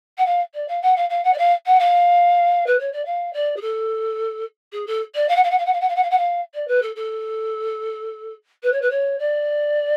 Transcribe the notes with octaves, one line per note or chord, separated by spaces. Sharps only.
F#5
F5
D5
F5
F#5
F5
F5
F#5
D5
F5
F#5
F5
B4
C#5
D5
F5
D5
G#4
A4
G#4
A4
D5
F5
F#5
F5
F#5
F5
F#5
F5
F#5
F5
F#5
F5
F#5
F5
D5
B4
A4
A4
B4
C#5
B4
C#5
D5